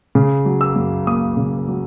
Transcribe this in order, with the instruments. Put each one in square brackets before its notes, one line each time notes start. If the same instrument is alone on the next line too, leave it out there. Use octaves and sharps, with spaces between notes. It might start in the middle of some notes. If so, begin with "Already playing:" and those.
[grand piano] C#3
F#3
E6
F#2
A#3 D#6
C#3
F#3